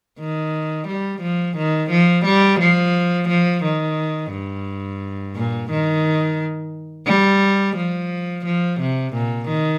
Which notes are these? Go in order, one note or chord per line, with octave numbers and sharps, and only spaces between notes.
D#3
G3
F3
D#3
F3
G3
F3
F3
D#3
G2
A#2
D#3
G3
F3
F3
C3
A#2
D#3